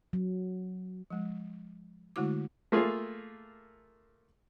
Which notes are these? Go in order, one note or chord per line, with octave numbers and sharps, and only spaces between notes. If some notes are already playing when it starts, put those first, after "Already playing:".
F#3
F3 G#3
D3 G#3 A3 E4 F#4 D6
A3 A#3 F4 G#4